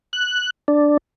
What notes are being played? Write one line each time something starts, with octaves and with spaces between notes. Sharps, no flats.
F#6
D4